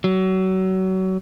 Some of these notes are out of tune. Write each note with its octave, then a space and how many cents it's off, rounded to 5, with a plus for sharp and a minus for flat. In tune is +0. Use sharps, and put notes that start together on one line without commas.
F#3 +30